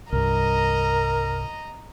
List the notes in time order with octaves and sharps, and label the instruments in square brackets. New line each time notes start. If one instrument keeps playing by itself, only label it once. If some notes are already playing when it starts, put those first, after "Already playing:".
[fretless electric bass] C2 G2 [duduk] A#4 [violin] D#5 A#5